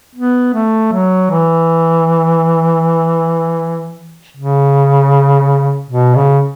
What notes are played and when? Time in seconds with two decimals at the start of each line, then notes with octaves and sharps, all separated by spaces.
0.15 B3
0.53 A3
0.92 F#3
1.30 E3
4.36 C#3
5.90 B2
6.15 C#3